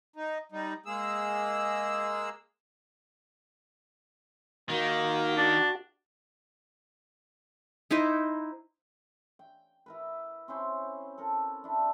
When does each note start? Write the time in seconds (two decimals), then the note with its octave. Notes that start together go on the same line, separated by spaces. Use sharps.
0.16 D#4
0.52 G3 D#4
0.86 G#3 A#3 G#4 E6
4.69 D#3 A#3 F#4
5.37 D4 F#4
7.91 D#4 E4 C5 D#5
9.39 G5
9.86 E4 A#4 B4
10.48 C4 C#4 E4 C5
11.18 A4 A#4
11.64 D4 E4